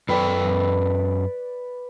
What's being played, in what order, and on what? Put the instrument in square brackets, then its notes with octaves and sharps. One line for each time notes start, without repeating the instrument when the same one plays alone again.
[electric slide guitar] F#2 A4 G5 [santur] B4 D5